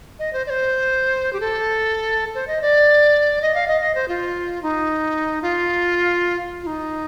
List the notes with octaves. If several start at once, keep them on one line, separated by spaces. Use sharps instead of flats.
D#5
C5
D5
C5
G4
A4
C5
D#5
D5
D#5
F5
D#5
D#5
C5
F4
D#4
F4
F4
D#4